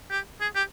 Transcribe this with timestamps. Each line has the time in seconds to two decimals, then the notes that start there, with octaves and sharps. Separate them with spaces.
0.10 G4
0.40 G#4
0.55 G4